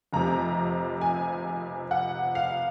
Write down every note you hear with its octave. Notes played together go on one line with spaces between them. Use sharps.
F1 F2 C3 A#5
G#5
F#5
F5